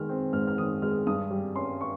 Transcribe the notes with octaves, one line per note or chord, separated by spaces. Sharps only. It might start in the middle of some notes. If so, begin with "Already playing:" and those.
Already playing: D#3 G#3 F6
C4
G#2 F6
F6
D#3 D#6
G#3 F6
G2 D#6
G3
C#4 C6
C#6